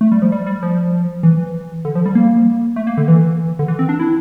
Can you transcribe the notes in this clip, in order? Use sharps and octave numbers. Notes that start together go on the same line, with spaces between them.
A3
G3
F3
G3
G3
F3
E3
D3
F3
G3
A#3
A3
A#3
D3
E3
D3
E3
C4
D4
E4